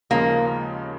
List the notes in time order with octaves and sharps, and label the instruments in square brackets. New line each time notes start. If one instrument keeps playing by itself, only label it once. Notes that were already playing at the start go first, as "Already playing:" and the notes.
[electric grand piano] D#2 C#3 F3 G#3 [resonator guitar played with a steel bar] A#3